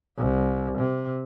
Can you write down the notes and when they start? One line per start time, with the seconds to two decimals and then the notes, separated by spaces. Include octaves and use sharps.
0.18 C2
0.79 C3